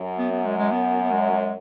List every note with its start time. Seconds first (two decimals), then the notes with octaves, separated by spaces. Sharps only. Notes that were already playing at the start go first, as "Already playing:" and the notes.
Already playing: F#2
0.18 B3
0.32 B3
0.45 G#3
0.58 G#3
0.72 B3
1.02 B3
1.12 G#3
1.32 G#3